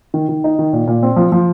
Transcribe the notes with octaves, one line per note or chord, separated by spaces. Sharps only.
D#3
D#3
D#4
D#3
A#2
A#2
C4
F3
F3